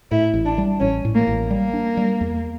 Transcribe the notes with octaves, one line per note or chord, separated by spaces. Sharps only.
A2 E4
A1
D4
G3
A1 C#4
A2
A#3
A1
G3 A#3
D4
G3
E2